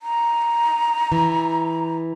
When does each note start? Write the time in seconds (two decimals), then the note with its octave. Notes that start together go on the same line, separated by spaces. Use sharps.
0.02 A#5
1.12 E3